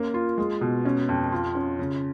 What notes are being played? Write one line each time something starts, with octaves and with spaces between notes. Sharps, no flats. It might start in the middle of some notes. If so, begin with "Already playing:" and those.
Already playing: A#3 C#4
F4
G#3
B2
C#4
F2
F4
C#4
C#3